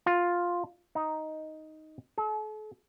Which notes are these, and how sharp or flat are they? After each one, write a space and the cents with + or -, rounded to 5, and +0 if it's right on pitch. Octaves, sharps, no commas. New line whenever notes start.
F4 +5
D#4 +5
A4 -40